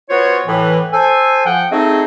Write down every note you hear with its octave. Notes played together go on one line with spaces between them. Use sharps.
B3 F4 F#4 C5 C#5
A2 E3
A4 C5 G#5
F3 F#5 G5
A3 C4 D#4 G#4 C5 D#5